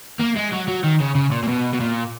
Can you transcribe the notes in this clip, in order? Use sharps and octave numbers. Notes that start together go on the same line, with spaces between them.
A#3
G#3
F#3
F#3
D#3
C#3
C#3
A#2
A#2
B2
B2
A#2